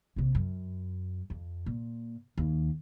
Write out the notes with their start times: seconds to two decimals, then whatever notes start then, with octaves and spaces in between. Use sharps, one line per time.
0.16 A#1 C3
0.35 F#2
1.30 F2
1.66 A#2
2.38 D#2